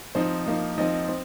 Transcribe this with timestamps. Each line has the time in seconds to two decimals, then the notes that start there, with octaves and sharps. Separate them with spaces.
0.15 F3 C4 D#4 C5
0.47 F3 A#3 D#4
0.78 F3 C4 D#4 D#5
1.08 C4